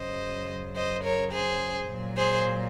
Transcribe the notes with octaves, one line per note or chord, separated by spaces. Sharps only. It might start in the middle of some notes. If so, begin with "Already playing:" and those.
Already playing: F#2 C#3 F#3 C5 D#5
C5 D#5
A#4 C#5
G#4 C5
A#2 F#3
G#4 C5